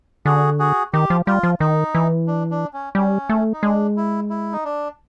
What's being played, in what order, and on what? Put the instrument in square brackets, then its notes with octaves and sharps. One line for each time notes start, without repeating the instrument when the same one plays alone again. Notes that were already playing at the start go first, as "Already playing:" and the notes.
[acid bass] D3 [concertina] F#4 G#4
[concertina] F#4 G#4
[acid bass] D#3 [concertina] G4
[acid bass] F3
[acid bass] G3 [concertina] F4
[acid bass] F3
[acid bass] D#3 [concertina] D#4
[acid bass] E3
[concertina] D4
D4
C#4
[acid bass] G3 [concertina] C#4
[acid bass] A3
[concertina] D#4
[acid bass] G#3 [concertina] D4
[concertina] E4
E4
D#4
D4